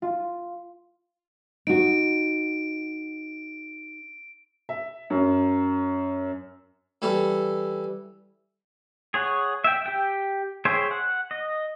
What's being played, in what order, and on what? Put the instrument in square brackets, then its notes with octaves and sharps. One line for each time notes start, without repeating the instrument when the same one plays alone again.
[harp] F4
[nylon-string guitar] D#4 F#4 [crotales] D7
[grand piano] E5
F#2
[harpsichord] E3 G3 A4
[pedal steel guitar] G#4 C#5 F#5
E5 G5
G4 G5
G#4 C5 C#5 E5 G5
F#5
D#5